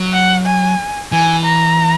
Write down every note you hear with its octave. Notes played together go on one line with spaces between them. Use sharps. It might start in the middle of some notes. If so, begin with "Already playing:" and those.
Already playing: F#3
F#5
G#5
E3 G#5
A#5